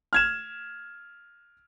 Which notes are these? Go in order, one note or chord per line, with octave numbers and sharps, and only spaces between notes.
F6 G#6 E7